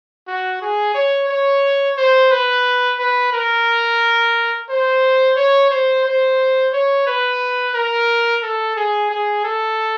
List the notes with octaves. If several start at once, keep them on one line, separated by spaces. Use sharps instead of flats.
F#4
G#4
C#5
C#5
C5
B4
B4
A#4
C5
C#5
C5
C5
C#5
B4
A#4
A4
G#4
G#4
A4